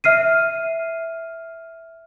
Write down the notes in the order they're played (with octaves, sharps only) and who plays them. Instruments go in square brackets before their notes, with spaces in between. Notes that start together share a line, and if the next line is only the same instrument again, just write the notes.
[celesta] E5 F6 C7 D#7